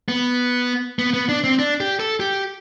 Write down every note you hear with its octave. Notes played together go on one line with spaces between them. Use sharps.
B3
B3
B3
D4
C4
D4
G4
A4
G4